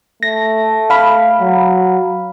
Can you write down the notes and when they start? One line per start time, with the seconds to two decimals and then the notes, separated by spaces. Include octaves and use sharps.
0.23 A3 A#6
0.90 F5 B5
1.41 F#3